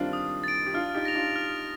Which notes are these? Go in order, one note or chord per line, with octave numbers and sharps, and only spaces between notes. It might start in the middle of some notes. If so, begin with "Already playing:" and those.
Already playing: D#3 G3 C4 D4 D#4 F4
D#6
A6 D7
G4
D4 F4 F6
D#4 G4
A#6 F7
D4 F4
F6